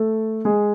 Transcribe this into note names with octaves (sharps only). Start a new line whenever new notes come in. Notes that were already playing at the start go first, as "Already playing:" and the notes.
Already playing: A3 A4
G#3 G#4